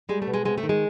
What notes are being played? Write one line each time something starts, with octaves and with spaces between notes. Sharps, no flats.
G3 G#3
A3
B2
G#3
C3 G#3
A3
D#3
G#3